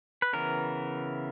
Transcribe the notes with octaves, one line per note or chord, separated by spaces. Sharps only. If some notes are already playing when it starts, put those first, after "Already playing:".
B4
C#3 E3 B3 A#4